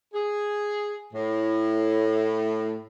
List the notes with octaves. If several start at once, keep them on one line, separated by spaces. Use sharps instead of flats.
G#4
A2